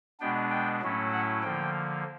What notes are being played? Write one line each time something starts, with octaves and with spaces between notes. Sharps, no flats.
B2 G#3 B3 D4 G5
G5
A2 F#3 A3 C#4 E4
F#5
D3 F3 A#3 G5